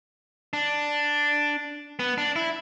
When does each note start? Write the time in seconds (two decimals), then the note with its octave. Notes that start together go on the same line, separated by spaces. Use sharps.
0.53 D4
1.99 B3
2.18 D4
2.36 E4